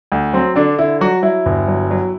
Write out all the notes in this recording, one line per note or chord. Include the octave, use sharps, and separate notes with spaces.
D2
F#3 C4
D3 D4
D3 E4
F#3 F#4
F#3 E4
G1
F#3
F#3